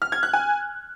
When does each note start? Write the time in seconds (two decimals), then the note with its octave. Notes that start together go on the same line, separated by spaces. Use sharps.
0.02 F6
0.12 G#6
0.23 F#6
0.33 G#5